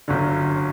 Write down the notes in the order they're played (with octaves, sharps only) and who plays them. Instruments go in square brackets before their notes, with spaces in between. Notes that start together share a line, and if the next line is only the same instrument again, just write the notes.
[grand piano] G1 F#2 D3